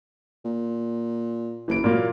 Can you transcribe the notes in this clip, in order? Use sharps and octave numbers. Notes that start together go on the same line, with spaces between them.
A#2
F#1 E3 D7
A#2 F#3 A#3